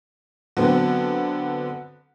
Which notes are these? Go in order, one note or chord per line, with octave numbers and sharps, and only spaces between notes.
D3 F#3 B3 C4